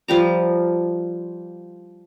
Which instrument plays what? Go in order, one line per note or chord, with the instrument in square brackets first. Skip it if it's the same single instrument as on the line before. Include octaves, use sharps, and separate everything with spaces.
[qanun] F3 G3 A#5